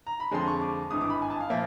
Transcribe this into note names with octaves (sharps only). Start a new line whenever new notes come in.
A#5
B5
F2 D3 F3 G#3 C6
C#6
D6
G#1 G2 E3 D#6
D6
B5
G#5
A5
F5
A#2 F3 A#3 E5